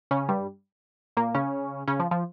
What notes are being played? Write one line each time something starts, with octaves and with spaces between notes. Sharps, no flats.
C#3 C#4
G2 G3
A#2 A#3
C#3 C#4
C#3 C#4
F3
F3